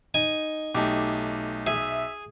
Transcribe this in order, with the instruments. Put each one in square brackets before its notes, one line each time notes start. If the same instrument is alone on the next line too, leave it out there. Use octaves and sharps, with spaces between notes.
[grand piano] D#4 [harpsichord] G#5
[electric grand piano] B1 D#4 [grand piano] A3 G4 [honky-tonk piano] D6
[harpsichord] G#4 [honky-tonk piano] E5